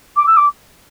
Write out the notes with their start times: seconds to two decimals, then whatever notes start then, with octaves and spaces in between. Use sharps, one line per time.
0.16 D6
0.26 E6
0.36 D6